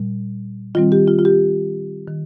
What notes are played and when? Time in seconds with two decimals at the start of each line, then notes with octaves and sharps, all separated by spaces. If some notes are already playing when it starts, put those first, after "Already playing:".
Already playing: A#2 G3
0.75 D#3 G3 C4 F4
0.92 G4
1.07 F4
1.19 F4
1.25 G4
2.08 D#3